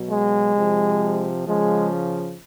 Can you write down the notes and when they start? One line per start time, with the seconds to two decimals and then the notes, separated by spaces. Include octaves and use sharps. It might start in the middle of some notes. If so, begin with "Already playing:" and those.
Already playing: B2 F#3
0.09 G#3
0.55 C3 F3
1.45 C#3 F3 G#3